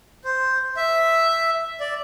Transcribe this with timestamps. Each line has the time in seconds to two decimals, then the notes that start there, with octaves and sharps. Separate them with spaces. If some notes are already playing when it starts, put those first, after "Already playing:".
0.24 C5
0.77 E5
1.80 D5